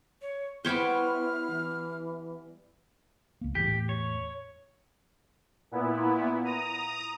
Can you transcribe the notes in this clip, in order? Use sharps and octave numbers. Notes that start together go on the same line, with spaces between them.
C#5
G3 B3 E4 C5 C#5 G5 F6
E3
C#2 A#3
E2 A2 G4
C#5
A#2 B3 E4
A#5 D#6